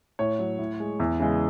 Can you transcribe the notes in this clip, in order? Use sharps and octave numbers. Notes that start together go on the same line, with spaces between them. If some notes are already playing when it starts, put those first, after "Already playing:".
A2 C#5
F#3
A2
G#3
E2
C#3 E3 G#3